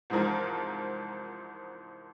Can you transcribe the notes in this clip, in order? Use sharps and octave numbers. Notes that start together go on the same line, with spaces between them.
C2 G#2 E3 F3 A#4